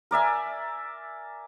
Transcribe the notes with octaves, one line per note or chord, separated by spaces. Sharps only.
A#4 D5 E5 G#5